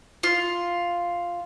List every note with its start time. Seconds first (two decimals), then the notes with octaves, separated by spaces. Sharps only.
0.23 F4